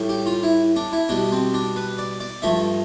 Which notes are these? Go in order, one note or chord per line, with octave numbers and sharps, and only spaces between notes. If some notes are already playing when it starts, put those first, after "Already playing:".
Already playing: A2 G3
G4
F4
E4
D4
E4
B2 G3 D4
C4
D4
B4
D5
D5
G2 F3 A3 E5